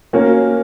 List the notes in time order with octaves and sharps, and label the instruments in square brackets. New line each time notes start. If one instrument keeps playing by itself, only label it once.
[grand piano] A#3 C#4 F#4 A#4 C#5